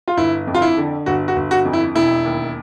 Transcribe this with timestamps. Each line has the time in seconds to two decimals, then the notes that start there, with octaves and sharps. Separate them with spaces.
0.08 F4
0.17 G1 E4
0.47 F2
0.54 F4
0.62 E4
0.77 D3
1.06 G1 F#4
1.28 F#4
1.36 G1
1.51 F#4
1.65 F2
1.73 E4
1.95 E1 E4
2.25 D#2